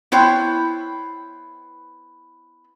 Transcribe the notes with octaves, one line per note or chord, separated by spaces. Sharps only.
B3 E4 C5 C#5 G5